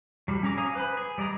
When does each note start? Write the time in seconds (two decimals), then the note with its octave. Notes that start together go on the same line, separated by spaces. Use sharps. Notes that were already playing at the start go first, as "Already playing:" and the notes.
0.28 F#3 G3
0.43 C#4 G#4 A#5 D6
0.57 C#5 F5 G#5 A#5 D#6
0.75 B4 C5 G#5 B5
0.97 G#4
1.18 G3 D5 D#5 A#5 D#6